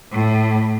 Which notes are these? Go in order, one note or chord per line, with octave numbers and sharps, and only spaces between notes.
A2